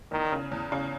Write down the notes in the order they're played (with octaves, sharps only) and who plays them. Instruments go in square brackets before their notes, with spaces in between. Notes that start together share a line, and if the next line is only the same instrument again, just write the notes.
[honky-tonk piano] E2 [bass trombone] D#3
[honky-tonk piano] C#3
E2
C#3